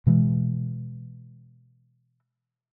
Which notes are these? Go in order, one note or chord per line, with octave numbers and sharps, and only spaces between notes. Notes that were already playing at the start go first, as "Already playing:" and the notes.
B2 E3 G#3